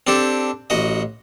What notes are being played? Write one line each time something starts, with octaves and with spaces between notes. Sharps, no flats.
C4 D4 G4 A4
A1 F#4 D#5